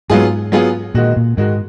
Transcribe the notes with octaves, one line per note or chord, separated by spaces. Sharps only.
G#2 F#3 B3 F4 G#4
F#3 B3 F4 G#4
A#2 D#3 G#3 D#4 F#4
A#2
G#2 D#3 G#3 D#4 F#4